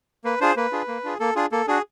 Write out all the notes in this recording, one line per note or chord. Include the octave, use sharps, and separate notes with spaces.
A#3 B4
D4 F4 G#4 C5
A#3 B4
D4 F4 G#4
A#3
D4 F4 G#4
A#3 A4
D4 F4 G#4
A#3 A4
D4 F#4 G#4